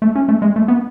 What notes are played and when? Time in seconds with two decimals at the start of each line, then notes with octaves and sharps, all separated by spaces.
0.02 A3
0.15 C#4
0.28 A3
0.42 G#3
0.56 A3
0.68 B3